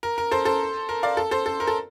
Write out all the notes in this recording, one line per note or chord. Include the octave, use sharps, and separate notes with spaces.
A#4
A#4
A4 C5
A4 C5
A#4
D5 F5
A4
A4 C5
A4
A#4
A4